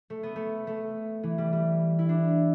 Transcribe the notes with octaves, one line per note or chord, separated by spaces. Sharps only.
A3
B3
A3
A3
E3
G3
G3
E4
D4